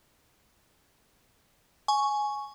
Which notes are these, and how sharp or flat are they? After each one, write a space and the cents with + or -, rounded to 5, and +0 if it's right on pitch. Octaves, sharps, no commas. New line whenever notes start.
G#5 +10 C#6 +0